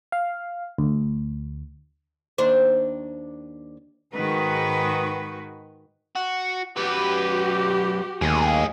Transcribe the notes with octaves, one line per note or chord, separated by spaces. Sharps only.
F5
D2
D#2 D4 C5
G#2 D#3 G#3 F#4 B4
F#4
F#2 F#4 G4 B4
D#2 A2 G#4